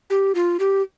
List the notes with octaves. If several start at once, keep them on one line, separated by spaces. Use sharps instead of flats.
G4
F4
G4